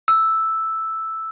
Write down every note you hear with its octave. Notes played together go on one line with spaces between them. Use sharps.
E6